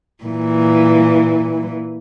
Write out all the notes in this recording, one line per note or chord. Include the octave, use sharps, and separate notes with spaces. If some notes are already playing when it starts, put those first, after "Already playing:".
A#2 E3